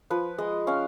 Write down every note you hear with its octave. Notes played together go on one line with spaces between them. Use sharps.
F3 B4
G#3 D#5
C#4 F5